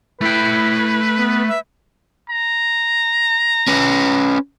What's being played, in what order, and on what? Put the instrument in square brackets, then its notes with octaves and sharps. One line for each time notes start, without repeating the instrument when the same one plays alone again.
[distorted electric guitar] A3 G5 [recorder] E4 [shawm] B4
[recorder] B3
E5
[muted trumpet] A#5
[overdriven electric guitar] C#4 B4